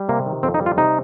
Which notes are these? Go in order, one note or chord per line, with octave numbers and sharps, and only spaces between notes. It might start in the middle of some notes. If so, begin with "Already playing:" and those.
Already playing: G3
C3 A#3
D#3
F2 C4
D#4
G3
F4
C3 D#4